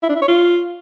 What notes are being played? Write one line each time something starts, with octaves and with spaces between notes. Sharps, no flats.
E4
D4
E4
C#5
F4